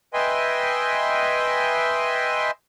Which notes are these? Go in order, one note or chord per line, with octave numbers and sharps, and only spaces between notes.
B4 D#5 E5 G5 G#5 C6